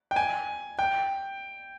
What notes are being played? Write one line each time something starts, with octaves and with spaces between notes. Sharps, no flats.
G5
G#5
G5